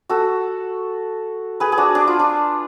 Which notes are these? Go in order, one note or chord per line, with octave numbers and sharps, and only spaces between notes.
F#4 A4
G#4 B4
G#4
D4 F#4
D4
F4
D4